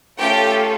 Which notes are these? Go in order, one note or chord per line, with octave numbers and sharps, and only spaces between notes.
A3 C#4 F4 G4 A4 G5